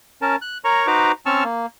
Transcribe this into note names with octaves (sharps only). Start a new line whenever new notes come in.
C#4 A#4 A5
F#6
A#4 C#5 A#5 C#6
D#4 F#4 B4 C5 A#5 D6
C4 C#4 A5 C#6 E6 F6
A#3